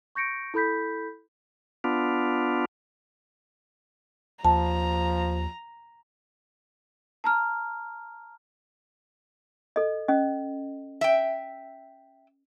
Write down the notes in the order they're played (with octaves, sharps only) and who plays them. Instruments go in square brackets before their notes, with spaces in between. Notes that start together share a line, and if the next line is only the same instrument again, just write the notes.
[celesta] C#6 G6 A#6 C#7 D7
E4 A4 B5 G6 B6
[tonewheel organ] B3 D4 F4
[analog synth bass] D#2 [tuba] F3 [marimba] A5 [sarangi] A#5
[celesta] A5 A#5 F6
[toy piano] A4 D#5
C#4 D#5
[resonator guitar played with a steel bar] E5 G5